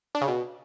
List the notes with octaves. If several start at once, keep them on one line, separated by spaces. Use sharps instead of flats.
D4
C#3
B2